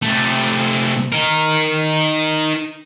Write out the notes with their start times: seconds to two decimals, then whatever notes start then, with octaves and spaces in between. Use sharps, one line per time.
0.02 C3 A3
1.12 D#4 A#4